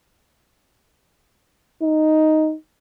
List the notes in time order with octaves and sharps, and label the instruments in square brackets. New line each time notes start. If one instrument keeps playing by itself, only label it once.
[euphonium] D#4